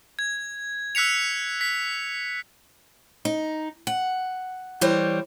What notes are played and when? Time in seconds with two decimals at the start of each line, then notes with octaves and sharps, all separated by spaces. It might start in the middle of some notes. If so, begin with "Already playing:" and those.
0.19 G#6
0.95 E6 F#6 B6 C#7 F7
1.61 B6
3.25 D#4
3.87 F#5
4.81 E3 G3 C5 C#5